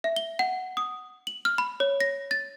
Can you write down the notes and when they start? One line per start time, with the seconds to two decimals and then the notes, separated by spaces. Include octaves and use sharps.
0.04 E5
0.16 G7
0.39 F#5
0.77 D#6
1.27 F#7
1.45 F6
1.58 B5
1.80 C#5
2.01 A#6
2.31 A6